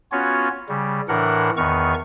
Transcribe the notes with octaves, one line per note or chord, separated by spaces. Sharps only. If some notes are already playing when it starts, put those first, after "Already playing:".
B3 C#4 F4 F#4 C#5
C#3 G3
A2 E3 D4 A#4 F#5
E2 D#3 B3 C#6 F6